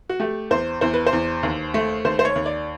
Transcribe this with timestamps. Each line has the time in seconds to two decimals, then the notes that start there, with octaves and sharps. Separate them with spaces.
0.09 F#4
0.20 A3 G4
0.51 E2 C5
0.81 E2 C5
0.94 B4
1.06 C5
1.13 E2
1.43 D#2
1.74 A3
2.04 D#2 C5
2.19 C5
2.25 C#5
2.36 D#2
2.46 D5